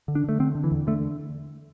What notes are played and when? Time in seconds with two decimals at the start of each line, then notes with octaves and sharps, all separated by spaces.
0.08 D3
0.15 D4
0.24 D3 A3
0.40 D3 C4
0.55 D3
0.64 E3
0.71 E2
0.87 D3 A3